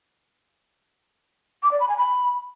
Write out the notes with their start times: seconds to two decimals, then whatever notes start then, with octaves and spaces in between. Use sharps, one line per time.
1.63 D6
1.71 D5
1.80 B5
1.89 G#5
1.97 B5